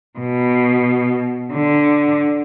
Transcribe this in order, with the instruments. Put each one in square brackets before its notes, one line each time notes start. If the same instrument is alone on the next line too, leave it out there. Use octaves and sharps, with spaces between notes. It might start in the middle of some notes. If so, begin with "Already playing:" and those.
[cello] B2
D3